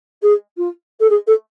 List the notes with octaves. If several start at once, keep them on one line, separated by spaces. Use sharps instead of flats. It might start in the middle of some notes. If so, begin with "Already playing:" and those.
G#4
F4
A4
G#4
A4